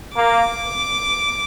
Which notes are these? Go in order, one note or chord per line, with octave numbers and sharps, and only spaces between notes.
A#3 D6